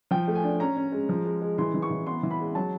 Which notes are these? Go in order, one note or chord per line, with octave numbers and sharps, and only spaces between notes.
F3 G5
A3
G#5
D4
C#4 A#5
C#4
G#3
F3
G#3
G#3
E3 C6
E3
C#6
E3
B3 C6
E3
B5
G#3
F#3 A5